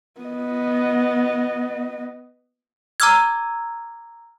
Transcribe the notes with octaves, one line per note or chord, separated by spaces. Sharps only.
B3 D#5
A#5 D6 E6 F6 G#6